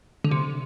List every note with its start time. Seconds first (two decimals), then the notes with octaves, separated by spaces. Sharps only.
0.24 D3
0.31 C3